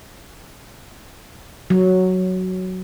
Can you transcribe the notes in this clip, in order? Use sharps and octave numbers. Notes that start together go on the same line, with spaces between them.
F#3